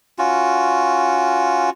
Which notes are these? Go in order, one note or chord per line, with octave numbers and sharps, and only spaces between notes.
C#4 F4 F#4